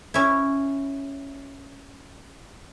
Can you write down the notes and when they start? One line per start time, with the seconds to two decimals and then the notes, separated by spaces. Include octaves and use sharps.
0.14 C#4 E4